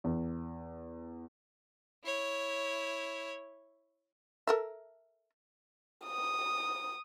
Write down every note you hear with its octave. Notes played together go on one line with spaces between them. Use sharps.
E2
E4 C#5
A4 A#4 E5
D#6